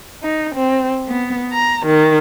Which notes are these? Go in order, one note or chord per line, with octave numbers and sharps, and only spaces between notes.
D#4
C4
B3
A#5
D#3